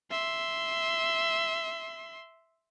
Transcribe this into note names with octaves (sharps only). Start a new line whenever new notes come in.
E5 C6